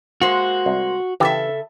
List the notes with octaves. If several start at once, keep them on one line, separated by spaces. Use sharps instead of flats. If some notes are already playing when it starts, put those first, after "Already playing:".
G#3 A#3 F#4 C5
C2
C#3 E3 G4 A4 E5